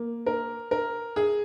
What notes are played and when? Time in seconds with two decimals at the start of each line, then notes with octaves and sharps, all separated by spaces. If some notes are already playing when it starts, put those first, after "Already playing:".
Already playing: A#3
0.26 A#4
0.71 A#4
1.16 G#4